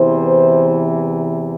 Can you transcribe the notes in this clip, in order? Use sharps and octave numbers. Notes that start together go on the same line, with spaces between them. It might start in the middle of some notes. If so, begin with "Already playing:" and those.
Already playing: E2 C3 E3 C5